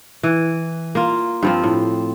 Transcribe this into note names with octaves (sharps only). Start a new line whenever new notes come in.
E3
A#3 F4
G2 F3 C4
A2